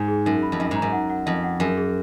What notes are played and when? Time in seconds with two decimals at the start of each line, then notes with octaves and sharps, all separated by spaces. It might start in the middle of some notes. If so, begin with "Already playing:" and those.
Already playing: G#2
0.08 G#4
0.25 F#2 D#4
0.43 B5
0.52 F2
0.59 F#2 D#5
0.71 G#2 A#5
0.82 F#2
0.92 F#5
1.10 F#5
1.26 F2 D#5
1.44 F#5
1.60 F#2 G#4
1.77 G#4